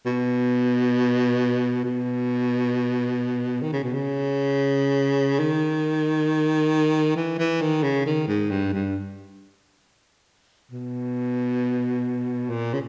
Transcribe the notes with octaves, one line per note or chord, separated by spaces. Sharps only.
B2
B2
D#3
C#3
B2
C#3
D#3
E3
E3
D#3
C#3
D#3
G#2
G2
G2
B2
A#2
C#3